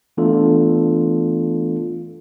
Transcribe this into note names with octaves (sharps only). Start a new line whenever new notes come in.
E3 A3 B3 D4 F4 A4